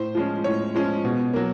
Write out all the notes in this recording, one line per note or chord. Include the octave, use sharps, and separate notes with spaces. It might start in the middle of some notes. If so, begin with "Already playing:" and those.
Already playing: A2 C5
F3 G#3 C#4
A2 C#5
F3 G#3 C#4
B2
F#3 A#3